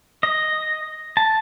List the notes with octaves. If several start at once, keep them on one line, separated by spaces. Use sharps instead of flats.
D#5
A5